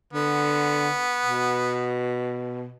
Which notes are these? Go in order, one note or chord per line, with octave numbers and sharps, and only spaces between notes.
D3 B3
B2